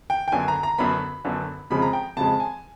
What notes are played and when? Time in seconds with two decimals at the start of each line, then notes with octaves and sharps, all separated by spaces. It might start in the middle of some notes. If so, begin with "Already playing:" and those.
0.10 G5
0.28 G5
0.32 F#2 D3 F#3 B3 G#5
0.48 A#5
0.63 A#5
0.78 F#2 D3 F#3 B3 B5
1.25 F#2 D3 F#3 B3
1.70 F2 C#3 F3 G#3 B5
1.82 A#5
1.93 G5
2.16 F2 C#3 F3 G#3 A5
2.40 G#5